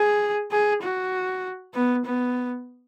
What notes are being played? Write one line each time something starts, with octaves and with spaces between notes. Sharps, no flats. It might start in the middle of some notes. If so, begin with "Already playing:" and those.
Already playing: G#4
G#4
F#4
B3
B3